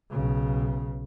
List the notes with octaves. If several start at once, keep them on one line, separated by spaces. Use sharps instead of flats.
B1 C#3